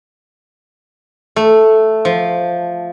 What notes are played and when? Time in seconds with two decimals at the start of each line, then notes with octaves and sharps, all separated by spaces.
1.36 A3
2.05 F3